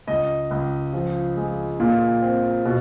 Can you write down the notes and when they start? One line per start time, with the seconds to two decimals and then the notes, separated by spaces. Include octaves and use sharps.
0.07 C#2 D#5
0.51 C#2
0.93 F3
1.37 G#3
1.80 A#2
2.22 C4
2.65 B2